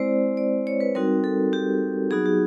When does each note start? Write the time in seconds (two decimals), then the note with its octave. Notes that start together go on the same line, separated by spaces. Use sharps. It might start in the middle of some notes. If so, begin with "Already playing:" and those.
Already playing: G#3 C4 E4 C5 D5
0.37 D5
0.67 C#5
0.80 B4
0.95 G3 C4 D#4 F#4 A#4
1.24 A4
1.53 G4
2.11 F#3 B3 D#4 F#4 G#4
2.26 G4